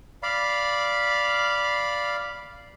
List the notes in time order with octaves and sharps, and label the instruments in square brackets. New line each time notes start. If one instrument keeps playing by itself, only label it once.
[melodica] D5 F5 B5